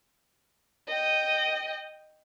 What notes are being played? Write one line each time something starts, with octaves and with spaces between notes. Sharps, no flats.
D#5 G5